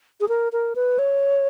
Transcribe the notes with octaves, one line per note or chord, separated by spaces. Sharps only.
G#4
A#4
A#4
B4
C#5